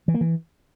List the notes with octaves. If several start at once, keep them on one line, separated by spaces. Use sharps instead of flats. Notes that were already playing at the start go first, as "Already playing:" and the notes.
E3
A#3
E3